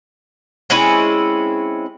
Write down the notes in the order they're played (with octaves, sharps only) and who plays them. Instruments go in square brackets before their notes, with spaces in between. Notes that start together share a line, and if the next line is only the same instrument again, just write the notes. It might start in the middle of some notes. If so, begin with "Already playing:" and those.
[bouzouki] G#3 C4 C#4 E4